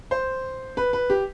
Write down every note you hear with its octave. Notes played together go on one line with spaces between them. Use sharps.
C5
B4
B4
G4